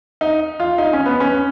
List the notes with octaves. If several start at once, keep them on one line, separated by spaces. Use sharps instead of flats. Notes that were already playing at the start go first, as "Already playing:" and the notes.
D#4
F4
D#4
C#4
B3
C#4